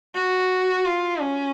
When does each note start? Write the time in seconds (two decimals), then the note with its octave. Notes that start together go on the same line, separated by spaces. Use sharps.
0.15 F#4
0.85 F4
1.21 C#4